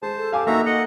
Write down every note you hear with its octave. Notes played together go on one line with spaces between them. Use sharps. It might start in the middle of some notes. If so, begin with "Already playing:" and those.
G#3 C5 A5
A4
G4 F5 G#5 D6
A#3 D#4 F#4 E5 A#5
D#5 F#5